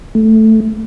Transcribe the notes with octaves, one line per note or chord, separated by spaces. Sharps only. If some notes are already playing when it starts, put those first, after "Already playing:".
A3